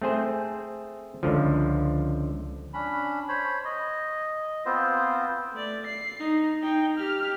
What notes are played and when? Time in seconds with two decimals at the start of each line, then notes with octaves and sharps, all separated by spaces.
0.02 A3 C4 G#4 C5
1.23 C#2 D3 F3
2.74 C#4 D4 B5
3.29 C5 C#5 B5
3.65 D#5
4.66 B3 C4 F4 C5
5.53 A3 D5
5.86 C7
6.20 D#4
6.63 D#4 G5
6.97 G4 F6